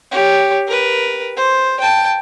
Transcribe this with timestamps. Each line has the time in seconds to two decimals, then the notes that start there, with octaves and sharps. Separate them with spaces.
0.11 G4 C#5
0.67 A#4 B4
1.37 C5
1.80 G5 A5